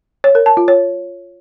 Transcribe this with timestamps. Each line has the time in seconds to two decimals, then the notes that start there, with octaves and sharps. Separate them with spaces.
0.24 C#5
0.35 A#4
0.46 A5
0.57 F4
0.68 C#5